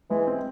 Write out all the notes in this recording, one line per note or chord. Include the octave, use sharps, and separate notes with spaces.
E3 G#3
C4